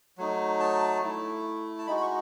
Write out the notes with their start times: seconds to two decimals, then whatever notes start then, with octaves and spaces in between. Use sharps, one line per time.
0.18 F#3 A3 D#4
0.60 A5
1.02 A3 E4
1.79 A5
1.87 G#3 D#4 F#4 B5
1.97 B5
2.01 C#6